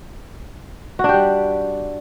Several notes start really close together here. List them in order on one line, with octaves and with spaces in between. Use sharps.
F#4 D4 G4 G3